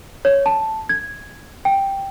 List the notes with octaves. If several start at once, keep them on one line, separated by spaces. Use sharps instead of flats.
C#5
A5
G#6
G5